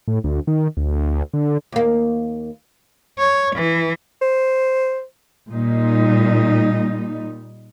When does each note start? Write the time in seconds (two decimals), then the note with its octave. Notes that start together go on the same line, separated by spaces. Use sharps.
0.08 A2
0.24 D2
0.47 D#3
0.77 D2
1.33 D3
1.72 D#2 A#3
3.18 C#5
3.55 E3
4.22 C5
5.49 A#2 G3 D#4